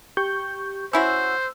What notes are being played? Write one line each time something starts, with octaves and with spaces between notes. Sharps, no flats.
G4 C#6 G6
C#4 E4 F#4 C5 E6